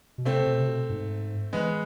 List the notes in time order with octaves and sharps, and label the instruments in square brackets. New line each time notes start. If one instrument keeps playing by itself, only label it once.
[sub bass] B2
[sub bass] C3 [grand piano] A3 C4
[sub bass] B2
C3
B2
G#2
[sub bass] E3 [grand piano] G#3 B3